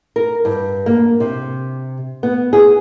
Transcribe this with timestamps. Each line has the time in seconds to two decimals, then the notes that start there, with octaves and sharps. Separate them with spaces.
0.16 A#4
0.45 G2
0.86 A#3
1.20 C3
2.23 B3
2.53 G#4